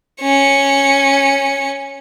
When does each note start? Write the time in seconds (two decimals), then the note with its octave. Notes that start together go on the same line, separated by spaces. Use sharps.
0.21 C#4 C#7